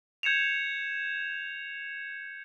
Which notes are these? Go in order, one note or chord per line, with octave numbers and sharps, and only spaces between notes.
G6 G#6 C#7 E7 F7